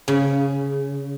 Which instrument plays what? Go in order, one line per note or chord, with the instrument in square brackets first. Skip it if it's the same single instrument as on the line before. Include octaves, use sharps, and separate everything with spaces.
[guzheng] C#3